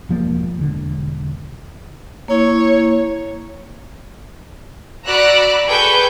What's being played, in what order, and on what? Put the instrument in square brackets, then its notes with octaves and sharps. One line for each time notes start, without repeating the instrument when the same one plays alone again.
[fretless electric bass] E1 F3 A#3
E1 D3
[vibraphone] A#3 E4 [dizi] C#5
[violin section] F#4 D5 A#5 B5 E6 F#6
G#4 A4 B4 G5 C#6 G6